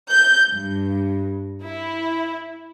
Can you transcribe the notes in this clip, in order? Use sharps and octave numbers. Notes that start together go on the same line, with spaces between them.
G6
G2
E4